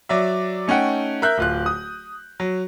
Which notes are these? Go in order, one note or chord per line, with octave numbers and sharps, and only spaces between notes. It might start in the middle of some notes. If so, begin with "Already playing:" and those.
F#3 D5 E5
A3 C#4 D#4 F#5 G5
A#4 E5 F#6 G6
D1 F4 F#6
D#6
F#3